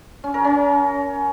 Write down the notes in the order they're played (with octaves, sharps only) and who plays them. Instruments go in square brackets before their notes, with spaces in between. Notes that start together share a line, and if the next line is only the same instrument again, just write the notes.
[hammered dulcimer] C#4
A#4
C#4